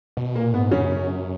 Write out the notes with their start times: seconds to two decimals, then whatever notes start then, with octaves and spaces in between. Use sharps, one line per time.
0.17 B2
0.35 A#2 A#3
0.53 G#2 B3
0.71 F#2 C#3 C#4